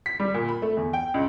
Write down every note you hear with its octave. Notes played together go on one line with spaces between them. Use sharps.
B6
G3
A#2
B5
A3
E2
G5
C#2